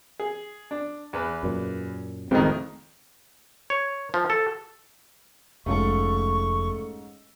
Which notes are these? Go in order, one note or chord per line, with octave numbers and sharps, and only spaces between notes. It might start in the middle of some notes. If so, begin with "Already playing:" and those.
G#4
D4
E2 B4
F#2 A#2
F1 F2 A2 D#3 G#3 C4
C#5
F3
A4
F1 G#2 A3 C#4 F4 A4 C#6